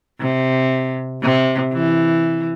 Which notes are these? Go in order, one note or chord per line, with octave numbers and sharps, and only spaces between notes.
C3
C3
E3